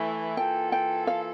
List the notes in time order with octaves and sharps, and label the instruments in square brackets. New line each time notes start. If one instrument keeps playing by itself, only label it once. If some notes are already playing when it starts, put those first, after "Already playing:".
Already playing: [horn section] E3 A3 E4
[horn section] E3 A#3 F4 A4 [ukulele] G5
[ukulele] G5
F5